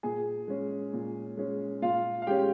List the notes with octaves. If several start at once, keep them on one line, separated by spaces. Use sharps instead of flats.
A#2 G#4 G#5
G#3 C#4
A#2
G#3 C#4
A#2 F4 F5
F5
G#3 C#4 G4 G5